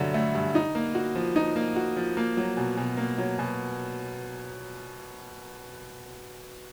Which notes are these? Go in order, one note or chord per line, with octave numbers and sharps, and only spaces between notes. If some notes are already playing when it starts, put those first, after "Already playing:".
Already playing: G2 D3 F#3 A3
A3
G2
D#4
A#3
F#4
F3
D#4
A#3
F#4
F3
A#3
F#3
B2
B2
A#3
F#3
B2